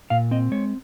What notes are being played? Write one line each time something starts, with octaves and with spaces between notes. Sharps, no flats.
A#2 F5
C4 D#5
G#3 C#5